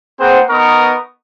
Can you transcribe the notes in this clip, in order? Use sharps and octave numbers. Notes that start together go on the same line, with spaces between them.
A#3 C4 G#4 B4 C5 F#5
B3 D#4 A#4 B4 C#6 D#6